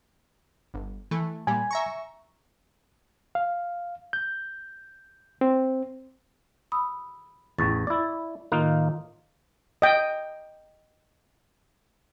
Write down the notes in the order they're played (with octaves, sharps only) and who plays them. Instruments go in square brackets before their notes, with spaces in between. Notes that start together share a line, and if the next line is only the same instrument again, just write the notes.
[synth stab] G1
E3 A3
[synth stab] A#2 G3 [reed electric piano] G#5
[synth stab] E5 A#5 C#6
[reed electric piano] F5
G6
C4
[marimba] B5 D#6 E6
[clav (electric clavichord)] A1 E2 [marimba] C#6 A6
[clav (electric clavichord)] E4 D5
[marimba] A2 D#3 [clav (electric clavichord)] A#3 D#4 F4
[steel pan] D#5 G5